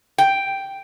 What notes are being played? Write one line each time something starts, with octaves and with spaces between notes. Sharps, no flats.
G5